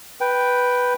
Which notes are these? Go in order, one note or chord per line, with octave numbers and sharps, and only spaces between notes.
B4 G5